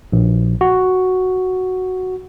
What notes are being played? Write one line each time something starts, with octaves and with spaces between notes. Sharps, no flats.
A#1
F#4